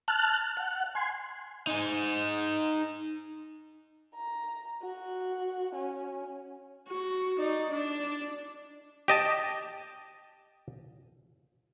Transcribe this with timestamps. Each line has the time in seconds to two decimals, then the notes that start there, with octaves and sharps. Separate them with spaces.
0.08 A5 F6 F#6
0.57 F#5
0.95 G#5 C6
1.67 D#4 G#5
4.15 A#5
4.83 F#4
5.75 C#4
6.89 F#4
7.39 D#4 D5
7.71 D4
9.08 G4 D#5 A5